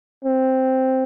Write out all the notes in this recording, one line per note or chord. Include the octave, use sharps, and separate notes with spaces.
C4